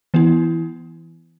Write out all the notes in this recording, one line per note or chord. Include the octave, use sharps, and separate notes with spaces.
E3 B3 E4